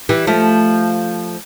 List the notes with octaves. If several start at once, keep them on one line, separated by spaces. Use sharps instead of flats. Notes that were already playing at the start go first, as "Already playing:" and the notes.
E3 G3
F3 A3